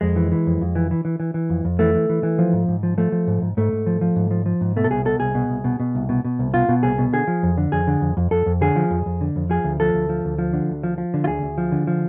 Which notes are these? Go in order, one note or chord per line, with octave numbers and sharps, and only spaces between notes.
F2 G#3
E3
E3
F2
F2
E3
E3
E3
E3
E3
F2
F2
E3 A3
E3
E3
E3
F3
G#2
G#2
F3
F3 A3
F3
G#2
G#2
G#2 A3
G#2
F3
F3
G#2
F3
F3
G#2
B2 A3
A4
C2 G#4
B2 A4
C2 G#4
B2
C2
B2
B2
C2
B2
B2
C2
B2 F4
B2
C2 G#4
B2
D3 G#4
F3
F2
D3
F2 G#4
D3
F2
F2
F2 A4
F2
D3 G#4
F3
F2
F2
D3
F2
F3 G#4
D2
F3 A4
D2
F3
D2
F3
D3
D2
F3
F3
D3
F4
D2 G#4
D2
F3
D3
F3